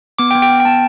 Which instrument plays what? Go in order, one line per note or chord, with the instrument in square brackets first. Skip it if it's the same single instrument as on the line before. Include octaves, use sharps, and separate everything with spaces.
[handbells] B3 D6
G5
B3
G5
B3
G5
B3 A5